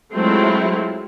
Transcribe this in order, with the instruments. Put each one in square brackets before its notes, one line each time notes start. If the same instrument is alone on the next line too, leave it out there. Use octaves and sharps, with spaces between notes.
[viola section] F#3 G#3 A3 C4 E4 F4